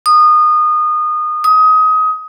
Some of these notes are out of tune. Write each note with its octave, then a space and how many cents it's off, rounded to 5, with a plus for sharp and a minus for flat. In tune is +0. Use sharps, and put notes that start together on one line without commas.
D#6 -25
D#6 +20